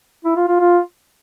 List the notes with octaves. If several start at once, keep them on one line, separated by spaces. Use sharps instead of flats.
E4
F4
F4
F4